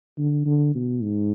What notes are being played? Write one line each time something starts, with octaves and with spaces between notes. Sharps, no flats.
D3
D3
B2
G#2